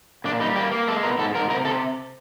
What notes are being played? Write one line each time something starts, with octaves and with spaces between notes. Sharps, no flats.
A#2 D4
G3 D#4
A#3 G4
A#3
G#3 A4
B2 A#4
G#2 A4
G#2 A#4
C3 A#4
C3 A4